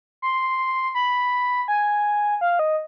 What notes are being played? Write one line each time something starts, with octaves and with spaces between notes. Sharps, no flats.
C6
B5
G#5
F5
D#5